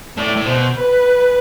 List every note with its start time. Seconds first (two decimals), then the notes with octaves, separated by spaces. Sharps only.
0.17 A2 D5
0.36 A2
0.46 B2 C5
0.75 B4